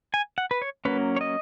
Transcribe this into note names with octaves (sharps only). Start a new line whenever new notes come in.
G#5
F#5
B4
C#5
F#3 A#3 C#4 B4
C#5
D#5